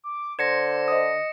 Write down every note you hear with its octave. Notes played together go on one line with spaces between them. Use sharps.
D6
D3 C5 G#6 A#6 C#7 E7
D#5 D#6